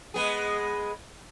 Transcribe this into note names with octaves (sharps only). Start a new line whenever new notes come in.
G#3 B3 G#4